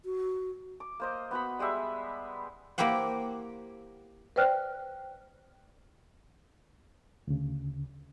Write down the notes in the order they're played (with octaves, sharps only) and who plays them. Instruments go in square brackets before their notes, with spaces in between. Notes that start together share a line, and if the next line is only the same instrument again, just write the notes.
[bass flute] F#4
[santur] D6
A#3 C5 D#5
B3 F#4 B5
G3 G#3 G4 E5
[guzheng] A#3 E4 G4 C5 F#5
[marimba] B4 C5 D5 G5 F6 F#6
[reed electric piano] D2 C#3